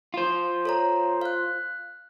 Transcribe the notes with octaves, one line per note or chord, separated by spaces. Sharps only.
F4 C5
A4 C#5 A#5
F5 F#6